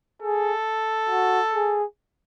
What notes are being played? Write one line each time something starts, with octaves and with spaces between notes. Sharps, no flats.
G#4 A4
F#4
G#4